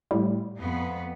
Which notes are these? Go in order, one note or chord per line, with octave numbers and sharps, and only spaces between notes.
A2 G3
F2 B3